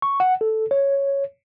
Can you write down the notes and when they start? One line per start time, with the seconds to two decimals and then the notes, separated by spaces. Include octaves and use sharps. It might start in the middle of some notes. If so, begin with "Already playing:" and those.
0.02 C#6
0.20 F#5
0.41 A4
0.71 C#5